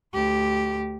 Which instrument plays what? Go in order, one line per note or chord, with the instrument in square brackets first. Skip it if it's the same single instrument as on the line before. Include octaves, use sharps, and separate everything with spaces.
[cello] D2 G4